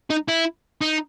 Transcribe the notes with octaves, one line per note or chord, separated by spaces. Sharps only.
D#4
E4
D#4